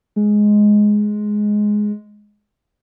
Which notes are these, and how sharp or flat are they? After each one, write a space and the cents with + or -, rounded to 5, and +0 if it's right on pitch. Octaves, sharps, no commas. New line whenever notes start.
G#3 +5